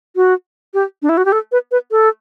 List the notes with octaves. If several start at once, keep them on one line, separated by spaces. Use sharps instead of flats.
F#4
G4
D4
E4
F#4
G4
A4
B4
B4
A4